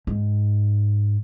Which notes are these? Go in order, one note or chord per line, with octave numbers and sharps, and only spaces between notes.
G#2